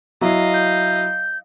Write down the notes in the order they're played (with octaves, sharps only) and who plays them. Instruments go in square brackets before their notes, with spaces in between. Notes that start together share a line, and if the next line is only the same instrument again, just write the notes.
[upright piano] F#3 E4 [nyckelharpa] D#5 F5
[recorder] G6